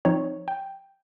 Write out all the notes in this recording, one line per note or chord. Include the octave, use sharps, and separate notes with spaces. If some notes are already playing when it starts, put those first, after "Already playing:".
F3 C4 D#4 C#5
G5